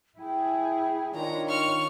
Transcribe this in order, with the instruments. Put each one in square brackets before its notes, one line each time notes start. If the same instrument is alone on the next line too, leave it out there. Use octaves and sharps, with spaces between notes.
[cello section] E4 G#4 [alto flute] G5
[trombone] D#3 [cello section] D4 F4 C#5 [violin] A#5
[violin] C#6 F6